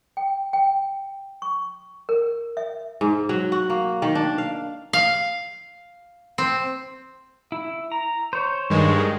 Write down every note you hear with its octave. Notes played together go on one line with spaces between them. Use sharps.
G5
G5
C#6
A#4
E5
G#2
F#3
F#4
A#3
D#3
D4
F5
F5
C4
E4
A#5
C5 C#5
G2 D#3 G#3